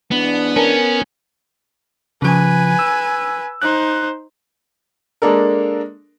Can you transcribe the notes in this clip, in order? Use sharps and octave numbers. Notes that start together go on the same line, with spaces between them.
G#2 E3 B3 D4
C#4 A#4 A5
C#3 F3 B4 G#5
E6
D#4 C5 F#6
G#3 A#3 D4 A4 A#4